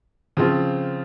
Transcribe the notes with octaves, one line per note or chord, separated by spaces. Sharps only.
C#3 F3 C4 F4